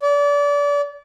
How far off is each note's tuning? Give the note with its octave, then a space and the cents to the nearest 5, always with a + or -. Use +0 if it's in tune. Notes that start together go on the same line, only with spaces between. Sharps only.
D5 -30